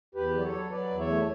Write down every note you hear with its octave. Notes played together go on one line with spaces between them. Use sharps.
E2 G4 B4
F#3 D5
A4 C#5
F#3
F#3 B4 D5
E2
C#5 E5
A3